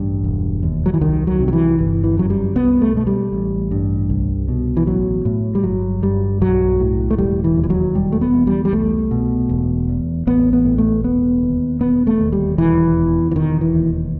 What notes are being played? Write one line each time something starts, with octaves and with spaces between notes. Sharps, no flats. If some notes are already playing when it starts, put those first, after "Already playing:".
Already playing: A1 G2
E1
D#2
F#3
E3
C2 D#3
F#3
C3
F#3
E3
G1 E3
E3
F#2 F#3
G3
C2 B3
A3
B2 A3
G3
A1
G2
C2
B2
E3
A1 F#3
A2
G3
G1 F#3
G2 G3
B1 F#3
A2
A3
E1 G3
E3
D#2
E3
F#3
E1 G3
A3
B3
E2
G3
G3
C2 A3
B2
E1
E2
A1 B3
B3
A2
A3
E1 B3
D#2
E1 B3
A3
D#2
G3
E1 E3
E2
E3
E1 D#3
E3
D#2